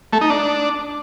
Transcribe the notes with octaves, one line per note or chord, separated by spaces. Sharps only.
A3
D#4
D4